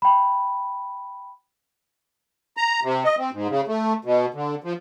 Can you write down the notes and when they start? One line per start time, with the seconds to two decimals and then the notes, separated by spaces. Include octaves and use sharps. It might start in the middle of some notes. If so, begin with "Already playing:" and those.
0.02 G5 B5
2.57 A#5
2.83 C3
3.04 D#5
3.18 C4
3.33 G#2
3.49 C#3
3.67 A3
4.05 B2
4.34 D3
4.64 F3